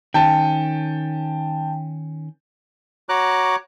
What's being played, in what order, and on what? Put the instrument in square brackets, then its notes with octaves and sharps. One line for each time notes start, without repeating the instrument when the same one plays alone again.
[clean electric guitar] D#3 C#4 [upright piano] G5 A5
[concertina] F#4 C#5 A#5 D6 F#6